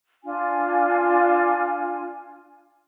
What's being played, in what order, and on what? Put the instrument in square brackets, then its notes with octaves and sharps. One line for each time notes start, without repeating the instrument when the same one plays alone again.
[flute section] D4 F4 G#5